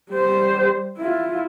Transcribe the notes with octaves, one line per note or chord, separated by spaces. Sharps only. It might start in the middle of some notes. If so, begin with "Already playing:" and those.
G3 C5
E4 F4